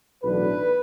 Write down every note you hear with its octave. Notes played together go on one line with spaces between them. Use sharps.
B1 A2 E3 B3 D4 B4